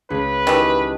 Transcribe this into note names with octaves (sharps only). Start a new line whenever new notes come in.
C#2 B4
D#3 E3 G4 A5 D#6